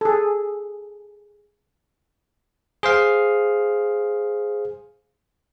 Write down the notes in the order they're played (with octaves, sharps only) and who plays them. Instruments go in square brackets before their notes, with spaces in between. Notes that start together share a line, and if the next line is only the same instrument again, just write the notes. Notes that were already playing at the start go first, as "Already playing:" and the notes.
[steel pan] G#4 A4
[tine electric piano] G#4 C5 F5